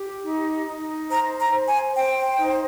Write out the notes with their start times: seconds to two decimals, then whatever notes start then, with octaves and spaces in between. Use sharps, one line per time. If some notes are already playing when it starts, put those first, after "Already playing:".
Already playing: G4
0.24 D#4
0.67 D#4
1.10 C5 A#5
1.39 A#5
1.53 C5
1.68 G#5
1.96 C5 G5
2.39 D#4